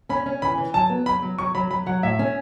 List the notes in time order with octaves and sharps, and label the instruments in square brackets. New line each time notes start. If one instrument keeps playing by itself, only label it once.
[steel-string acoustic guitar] C#4 [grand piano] B5
[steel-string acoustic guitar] C#4
[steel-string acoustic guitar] E3 [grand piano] B5
[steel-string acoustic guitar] E3
[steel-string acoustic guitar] F#3 [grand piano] A5
[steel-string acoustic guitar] B3
[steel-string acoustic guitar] F#3 [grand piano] B5
[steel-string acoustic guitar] F#3
[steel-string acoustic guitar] F#3 [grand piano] C#6
[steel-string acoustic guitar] F#3 [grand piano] B5
[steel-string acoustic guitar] F#3 [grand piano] B5
[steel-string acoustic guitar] F#3 [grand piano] F#5
[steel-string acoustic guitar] A2 [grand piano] E5
[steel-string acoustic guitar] C#4